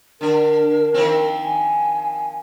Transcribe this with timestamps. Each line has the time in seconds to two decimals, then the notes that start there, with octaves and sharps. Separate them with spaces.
0.21 D3 D4 A#4
0.94 D#3 F3 C4
1.43 G#5